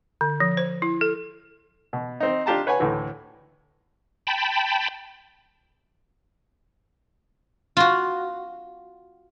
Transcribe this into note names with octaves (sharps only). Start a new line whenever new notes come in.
D3
F3
C5
E4
A4
B2
C4 D#4
D4 F4 G4 A5 A#5
B4 C#5 F#5 G#5
D2 A2 E3
G5 A5 B5
F4 F#4